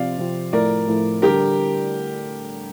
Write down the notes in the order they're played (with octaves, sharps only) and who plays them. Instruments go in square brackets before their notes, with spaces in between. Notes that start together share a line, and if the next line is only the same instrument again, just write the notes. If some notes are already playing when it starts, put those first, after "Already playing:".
Already playing: [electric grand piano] C3 F3 C4 F4 [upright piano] D5 F5
[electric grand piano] C3 F3 C4 F4
[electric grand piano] A2 F3 A3 E4 [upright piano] A#4 D5
[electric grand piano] A2 F3 A3 E4
[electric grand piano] D3 G3 D4 [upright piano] G4 A#4